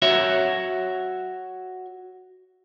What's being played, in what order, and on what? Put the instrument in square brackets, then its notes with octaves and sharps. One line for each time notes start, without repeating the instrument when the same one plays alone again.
[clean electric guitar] F#4 C#5 E5